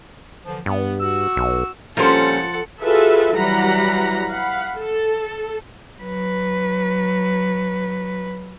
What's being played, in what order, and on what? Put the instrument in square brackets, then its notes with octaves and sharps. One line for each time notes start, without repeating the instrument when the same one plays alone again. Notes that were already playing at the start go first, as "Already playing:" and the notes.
[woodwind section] D3 E3 F3
[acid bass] G2 [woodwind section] B3
[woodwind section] F#4 E6
[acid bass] B1
[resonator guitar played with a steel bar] A#2 G3 C#4 [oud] F3 C5 [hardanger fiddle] A4 F#5
[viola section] F4 F#4 G#4 A4 B4 E5
E3 F#3 G3 F#5 A#5 B5
F5 F#5 B5
A4
[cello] F#3 B4